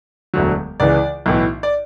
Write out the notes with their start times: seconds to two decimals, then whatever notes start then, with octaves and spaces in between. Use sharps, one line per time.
0.34 E1 D2 D3 F#3
0.80 C#2 C#3 E3 D5
1.26 B1 A2 E3
1.63 D5